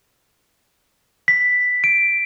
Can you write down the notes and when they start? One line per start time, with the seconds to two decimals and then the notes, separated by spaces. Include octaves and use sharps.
1.28 B6
1.84 D7